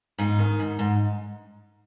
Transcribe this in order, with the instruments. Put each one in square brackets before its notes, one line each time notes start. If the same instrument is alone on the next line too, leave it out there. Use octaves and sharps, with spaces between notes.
[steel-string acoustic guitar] G#2 D#4
D#3
G#2
G#2